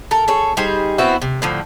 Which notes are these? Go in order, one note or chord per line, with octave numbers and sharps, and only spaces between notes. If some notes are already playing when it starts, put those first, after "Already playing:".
A4 A#4
G#4 A4 C#5
G3 D#4 G#4 C5
B3 C4 E4 F#4
C3
A2 D3 F3